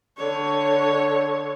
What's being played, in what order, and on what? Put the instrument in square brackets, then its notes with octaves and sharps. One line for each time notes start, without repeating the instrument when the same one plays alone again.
[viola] D3 C#5